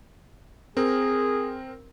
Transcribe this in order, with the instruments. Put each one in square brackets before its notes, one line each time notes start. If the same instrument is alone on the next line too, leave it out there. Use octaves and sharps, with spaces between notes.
[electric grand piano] C4 A#4 [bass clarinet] G#4